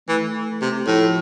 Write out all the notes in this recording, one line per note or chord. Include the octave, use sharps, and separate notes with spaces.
E3 A3
C3
A2 F3